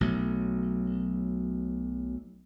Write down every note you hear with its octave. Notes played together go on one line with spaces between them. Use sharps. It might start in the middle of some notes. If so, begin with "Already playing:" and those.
B1 F#3 A3